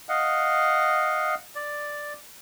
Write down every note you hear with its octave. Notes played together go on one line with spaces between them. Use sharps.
D#5 F5 F#5
D5